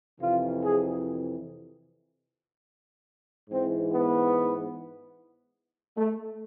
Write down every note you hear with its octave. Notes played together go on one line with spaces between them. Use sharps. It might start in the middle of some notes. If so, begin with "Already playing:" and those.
F2 C3 E3 F4
G#4
G#2 E3 C4
B3
A3